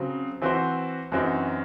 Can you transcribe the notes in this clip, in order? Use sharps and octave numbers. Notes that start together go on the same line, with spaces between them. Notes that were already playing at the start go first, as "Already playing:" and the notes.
Already playing: C#3 F#3 C4
E3 C4 F#4 C5
F#2 E3 C4 D#4 F#4